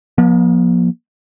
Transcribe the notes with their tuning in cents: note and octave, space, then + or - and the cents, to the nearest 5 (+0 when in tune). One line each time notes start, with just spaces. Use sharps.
F3 +20 A#3 +45